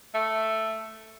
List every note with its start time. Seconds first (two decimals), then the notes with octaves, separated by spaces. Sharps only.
0.14 A3